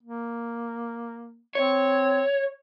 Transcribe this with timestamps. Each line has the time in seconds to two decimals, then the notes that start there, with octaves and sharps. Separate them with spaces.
0.03 A#3
1.55 C4 C#5